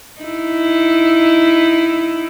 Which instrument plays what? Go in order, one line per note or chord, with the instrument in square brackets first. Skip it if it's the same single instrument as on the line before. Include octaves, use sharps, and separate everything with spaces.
[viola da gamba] D#4 E4